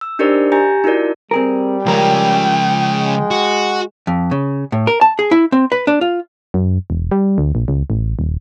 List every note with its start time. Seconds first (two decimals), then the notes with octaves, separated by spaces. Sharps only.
0.01 E6
0.19 D4 D#4 G4 A#4 C5 D5
0.52 G4 G#5 A#5 G6 A#6
0.84 D#4 E4 F#4 A#4 D5
1.31 G3 C4 G#4 A#4
1.86 C#2 F3 C#4 A#4 G5
2.90 G#3
3.31 F#4
4.07 F2
4.31 C#3
4.72 A2
4.87 A#4
5.01 A5
5.19 G#4
5.31 E4
5.52 C4
5.72 B4
5.87 D4
6.01 F4
6.54 F#2
6.90 E1
7.11 G3
7.38 D2
7.55 A#1
7.68 C#2
7.90 A1
8.19 D#1